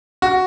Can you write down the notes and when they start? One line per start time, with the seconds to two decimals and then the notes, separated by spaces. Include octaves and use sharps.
0.22 F#4